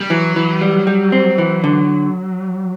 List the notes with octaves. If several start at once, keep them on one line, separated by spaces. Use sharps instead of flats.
G3
E3 F#3
E3
G3
G3
C4
E3
D3